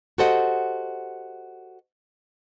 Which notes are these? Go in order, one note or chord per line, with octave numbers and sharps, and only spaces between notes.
F#4 G4 A4 C5 D#5 F#5